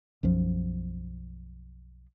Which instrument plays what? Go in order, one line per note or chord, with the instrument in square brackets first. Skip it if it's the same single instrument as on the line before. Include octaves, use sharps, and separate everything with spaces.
[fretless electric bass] B1 F#2 F3